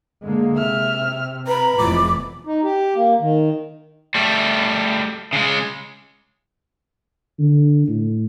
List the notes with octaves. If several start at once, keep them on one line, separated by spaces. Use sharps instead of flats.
D3 G#3 A#3
C3 E5 F6
B4 A#5 B5
F1 E2 A2 E3 F3 G#3 D6
D#4
G4
A#3
D#3
G3 A3
C#3 G#3
D3
A2